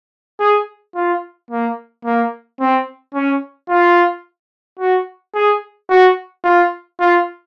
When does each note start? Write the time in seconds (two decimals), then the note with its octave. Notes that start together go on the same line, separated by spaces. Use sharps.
0.40 G#4
0.95 F4
1.51 A#3
2.05 A#3
2.60 C4
3.14 C#4
3.70 F4
4.79 F#4
5.34 G#4
5.90 F#4
6.44 F4
7.00 F4